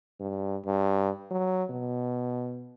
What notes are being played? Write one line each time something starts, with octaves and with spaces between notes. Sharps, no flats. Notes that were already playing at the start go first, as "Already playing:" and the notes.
G2
G2
F#3
B2